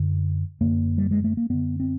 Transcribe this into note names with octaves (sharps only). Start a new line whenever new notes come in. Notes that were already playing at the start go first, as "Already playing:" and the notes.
Already playing: F#2 D3
F#2 D3 A#3
G3
G#3
A3
A#3
F#2 D3 B3
C4